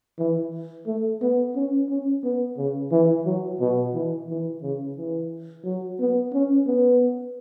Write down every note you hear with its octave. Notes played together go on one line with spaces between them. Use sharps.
E3
A3
B3
C#4
C#4
B3
C#3
E3
F#3
B2
E3
E3
C#3
E3
F#3
B3
C#4
B3